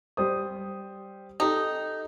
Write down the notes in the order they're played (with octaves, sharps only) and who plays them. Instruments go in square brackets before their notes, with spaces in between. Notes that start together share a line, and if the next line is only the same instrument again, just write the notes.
[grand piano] G3 C5 D#6
[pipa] D#4 [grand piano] G4 A4